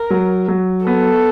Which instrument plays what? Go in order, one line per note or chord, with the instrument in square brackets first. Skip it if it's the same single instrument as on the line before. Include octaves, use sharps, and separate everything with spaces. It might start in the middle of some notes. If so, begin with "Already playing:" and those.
Already playing: [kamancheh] A#4
[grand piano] F#3
F#3
[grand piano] B3 [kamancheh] A4